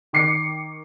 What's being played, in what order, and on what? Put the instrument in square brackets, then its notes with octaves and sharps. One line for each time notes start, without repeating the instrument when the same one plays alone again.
[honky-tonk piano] D#3 D6 C7 C#7